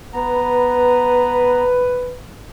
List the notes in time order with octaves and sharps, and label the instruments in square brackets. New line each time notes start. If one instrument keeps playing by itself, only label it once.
[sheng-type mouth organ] B3 A#5 [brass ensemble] B4